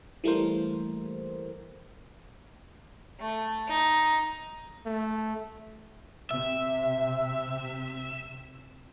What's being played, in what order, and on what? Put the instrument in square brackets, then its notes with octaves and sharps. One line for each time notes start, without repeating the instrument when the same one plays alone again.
[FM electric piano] E3 G3 A3 A#3 A#4 C5
[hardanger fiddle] A3
D#4
[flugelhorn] A3
[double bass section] C3 [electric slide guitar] E5